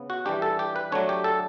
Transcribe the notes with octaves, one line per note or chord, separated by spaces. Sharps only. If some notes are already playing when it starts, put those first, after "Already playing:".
Already playing: C#3 B3
F#4
E3 G3 D4 G4
A4
G4
B4
F#3 A3 D4 C#5
G4
A4